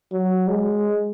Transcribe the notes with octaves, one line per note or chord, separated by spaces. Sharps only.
F#3
G#3